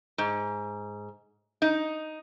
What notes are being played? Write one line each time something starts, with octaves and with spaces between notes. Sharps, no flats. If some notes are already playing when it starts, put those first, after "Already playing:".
G#2
D#4